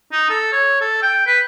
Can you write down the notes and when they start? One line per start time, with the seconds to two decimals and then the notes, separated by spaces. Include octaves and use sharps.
0.12 D#4
0.30 A4
0.52 C#5
0.81 A4
1.02 G5
1.26 B4